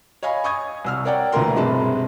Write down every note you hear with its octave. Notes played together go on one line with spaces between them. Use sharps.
C#5 D#5 F5 G#5 B5
C#6 D#6 G#6
C2 E6 F6
A#4 C#5 D5 F#5 G5
D2 A#2 E3 A#3 A#4 C6
B1 G2 C3 G#3 B4 A5